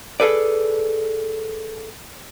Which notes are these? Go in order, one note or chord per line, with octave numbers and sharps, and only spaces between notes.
G#4 A4 B4 D5